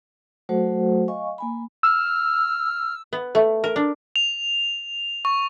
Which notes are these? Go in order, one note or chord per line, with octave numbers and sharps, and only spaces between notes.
F#3 A3 F#4 A4 C5 F#5
D#5 F5 G#5 C#6
A#3 G#5 B5
E6 F6
B3
A3
A#4
D4
F7
C#6